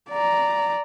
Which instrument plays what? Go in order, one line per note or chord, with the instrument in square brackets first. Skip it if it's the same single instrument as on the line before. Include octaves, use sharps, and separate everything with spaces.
[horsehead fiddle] D5 A#5